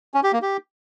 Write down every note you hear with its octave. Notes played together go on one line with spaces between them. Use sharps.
C#4
G4
A#3
G4